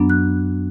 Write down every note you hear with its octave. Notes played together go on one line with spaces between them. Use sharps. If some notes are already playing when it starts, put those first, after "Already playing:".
Already playing: F#2 F#3 B3 D4
F#6